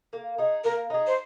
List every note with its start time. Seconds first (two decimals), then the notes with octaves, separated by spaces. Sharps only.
0.13 A#3
0.38 D#4 G#4
0.64 A#3 A#4
0.90 D#4 G#4
1.07 C5